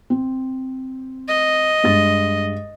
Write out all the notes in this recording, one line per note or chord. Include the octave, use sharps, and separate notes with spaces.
C4
D#5
G2 G#3 A6